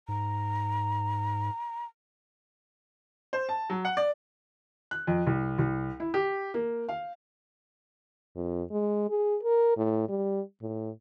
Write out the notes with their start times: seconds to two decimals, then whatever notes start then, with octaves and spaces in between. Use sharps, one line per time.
0.08 G#2 A#5
3.33 C5
3.49 A5
3.70 F#3
3.85 F#5
3.97 D5
4.91 F#6
5.07 F2
5.27 C2
5.58 C2
6.00 E4
6.14 G4
6.54 A#3
6.89 F5
8.36 F2
8.71 G#3
9.10 G#4
9.43 A#4
9.77 A2
10.09 G3
10.62 A2